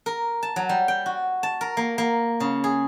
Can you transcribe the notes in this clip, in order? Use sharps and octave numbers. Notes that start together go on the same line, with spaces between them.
A#4
A5
F#3
G3
G5
F#4
A5
A#4
A#3
A#3
C#3
G#4